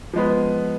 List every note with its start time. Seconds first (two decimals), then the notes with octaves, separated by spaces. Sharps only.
0.13 F3 G#3 B3